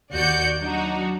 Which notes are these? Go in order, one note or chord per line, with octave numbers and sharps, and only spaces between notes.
D#2 F#4 D5 G6 C#7
F#3 D4 D#4 F#4